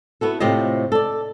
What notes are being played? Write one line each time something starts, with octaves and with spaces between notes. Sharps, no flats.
B3 E4 F#4 A4
A2 C3 F4 G4 C5 D#5
A4 D5